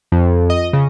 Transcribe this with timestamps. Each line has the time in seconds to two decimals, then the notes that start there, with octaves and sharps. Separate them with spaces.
0.12 F2
0.50 D#5
0.73 C#3